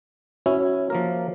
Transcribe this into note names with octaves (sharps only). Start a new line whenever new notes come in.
C#4 E4 F#4 C#5 E5
F3 A#3 A#4